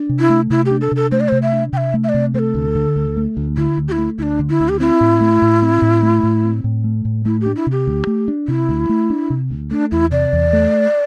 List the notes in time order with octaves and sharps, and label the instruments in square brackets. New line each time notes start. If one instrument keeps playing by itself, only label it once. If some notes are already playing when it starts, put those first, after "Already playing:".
Already playing: [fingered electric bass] D4
C3
[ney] E4
[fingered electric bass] A3
[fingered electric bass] C3 [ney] E4
[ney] G4
[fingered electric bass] D4
[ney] A4
[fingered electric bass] C3 [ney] A4
[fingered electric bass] A3 [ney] C5
[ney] D5
[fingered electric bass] C3 [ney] C5
[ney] E5
[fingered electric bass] D4
[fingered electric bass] C3 [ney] G5
[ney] E5
[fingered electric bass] A3
[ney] E5
D5
[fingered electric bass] C3
[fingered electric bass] A3 [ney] C5
[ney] A4
[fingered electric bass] D2
D3
D2
A3
D2
[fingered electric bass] D3 [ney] E4
[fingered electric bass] D2
[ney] G4
E4
[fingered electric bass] A3
[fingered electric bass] D2 [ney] D4 E4
[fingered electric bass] D3
[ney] E4
[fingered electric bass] D2
[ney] G4
[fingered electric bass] C4 [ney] E4
[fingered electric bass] A2
A3
A2
C4
A2
A3
A2
C4
A2
A3
A2
[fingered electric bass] A3 [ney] E4
[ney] G4
[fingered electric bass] D4
[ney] E4
[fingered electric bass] C3 [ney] G4
[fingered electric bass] D2
A3
D4
[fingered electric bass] C3 [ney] E4
[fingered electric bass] D2
A3
D4
C3
D2
[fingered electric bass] A3 [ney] D4
[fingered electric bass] E2 [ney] E4
[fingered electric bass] C3 [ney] D5
[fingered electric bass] E2
A3